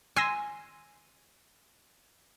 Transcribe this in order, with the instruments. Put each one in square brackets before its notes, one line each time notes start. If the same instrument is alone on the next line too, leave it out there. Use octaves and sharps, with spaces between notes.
[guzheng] G#5 [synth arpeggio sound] C6 E6 A#6